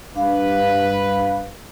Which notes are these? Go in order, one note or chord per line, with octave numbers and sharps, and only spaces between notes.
G2 D4 B4 F5